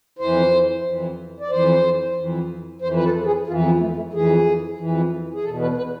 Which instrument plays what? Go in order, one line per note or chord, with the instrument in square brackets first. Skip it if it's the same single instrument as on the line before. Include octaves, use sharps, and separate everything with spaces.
[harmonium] F2 E3 C5
F2 E3
D5
F2 E3 C5
F2 E3
F2 C5
E3
B4
A4
G#4
F2 E3 F4
B3
A3
A3
F2 E3 G#4
F2 E3
G#4
E2 B2 A4
B4
B4